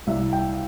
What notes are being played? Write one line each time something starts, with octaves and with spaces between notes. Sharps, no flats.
C2 E5
G5